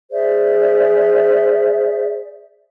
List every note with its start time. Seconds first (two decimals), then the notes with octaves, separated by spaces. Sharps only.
0.11 G#4 C5 D5 E5